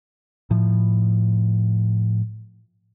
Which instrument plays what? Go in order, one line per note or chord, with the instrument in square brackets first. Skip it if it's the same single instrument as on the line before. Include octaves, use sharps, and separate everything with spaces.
[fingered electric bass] A2 F3